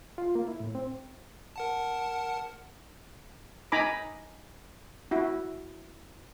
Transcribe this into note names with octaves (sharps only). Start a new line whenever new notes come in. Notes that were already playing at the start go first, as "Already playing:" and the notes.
F4
A#3
E4
A2
C4
A#4 F#5 A5
D#4 G#5 A#5 B5 D6
E4 F#4